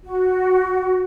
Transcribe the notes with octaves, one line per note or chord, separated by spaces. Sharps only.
F#4